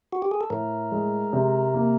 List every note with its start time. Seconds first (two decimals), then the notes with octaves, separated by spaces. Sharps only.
0.13 F#4
0.22 G4
0.31 G#4
0.41 A4
0.50 A2 A#4
0.92 G#3
1.33 C3
1.74 A#3